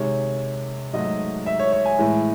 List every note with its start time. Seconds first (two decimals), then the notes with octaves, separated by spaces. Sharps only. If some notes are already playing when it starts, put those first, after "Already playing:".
Already playing: C3 D#3 G#3 C#5
0.93 G#2 F#3 A3 D#5
1.46 E5
1.59 C#5
1.72 C#5
1.85 G#5
1.98 A2 E3 G#3